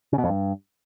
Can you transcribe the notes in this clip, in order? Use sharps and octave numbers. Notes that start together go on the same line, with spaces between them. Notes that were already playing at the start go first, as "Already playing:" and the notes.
C#3
B2
F2
G2